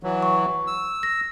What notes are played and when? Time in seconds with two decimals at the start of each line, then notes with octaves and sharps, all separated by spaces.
0.03 E3 F#3
0.23 C#6
0.67 E6
1.03 A#6